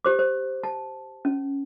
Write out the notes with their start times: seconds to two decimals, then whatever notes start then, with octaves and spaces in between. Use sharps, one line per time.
0.05 G4 C5 D6
0.19 C5
0.63 A5
1.25 C#4